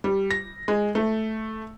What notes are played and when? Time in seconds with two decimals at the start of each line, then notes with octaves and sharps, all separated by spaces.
0.04 G3
0.31 A#6
0.68 G#3
0.95 A3